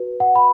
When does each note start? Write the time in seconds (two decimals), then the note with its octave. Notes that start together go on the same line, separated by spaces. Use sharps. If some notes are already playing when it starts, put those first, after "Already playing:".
Already playing: F#4 B4
0.20 F#5
0.36 B5